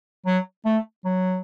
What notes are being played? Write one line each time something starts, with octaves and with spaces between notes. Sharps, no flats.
F#3
A3
F#3